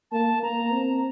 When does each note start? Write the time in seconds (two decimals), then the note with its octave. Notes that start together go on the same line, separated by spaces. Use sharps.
0.11 A#3 A5
0.43 A#3 A#5
0.73 C4